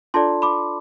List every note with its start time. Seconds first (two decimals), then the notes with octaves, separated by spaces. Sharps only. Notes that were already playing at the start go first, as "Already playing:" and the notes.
0.14 D4 F4 A4 D5 A5 C6
0.42 B5 D6